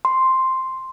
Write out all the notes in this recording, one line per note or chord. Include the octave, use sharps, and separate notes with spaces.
C6